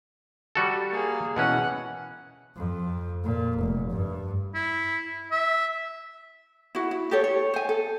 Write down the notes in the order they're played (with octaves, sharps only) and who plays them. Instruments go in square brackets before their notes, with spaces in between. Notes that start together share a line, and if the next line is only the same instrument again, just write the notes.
[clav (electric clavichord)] G3 F#4 A4
[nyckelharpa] A#3 G#4
[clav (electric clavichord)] B2 E3 C#4 [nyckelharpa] F#5
[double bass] F2
A#2
F1
G2
[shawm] E4
E5
[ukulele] E4 F#4
E4
G4 A4 C#5
C#5
C5 G#5
A4